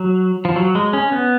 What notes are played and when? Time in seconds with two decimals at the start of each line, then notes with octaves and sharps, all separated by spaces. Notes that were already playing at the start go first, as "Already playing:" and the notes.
Already playing: F#3
0.45 F3
0.56 F#3
0.75 G#3
0.93 C#4
1.12 B3